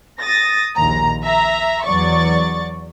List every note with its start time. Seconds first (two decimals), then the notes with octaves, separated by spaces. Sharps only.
0.21 D#6 A6 A#6
0.76 A#1 D#2 A#5
1.24 E5 A#5
1.85 E2 F#3 D5 C#6 A6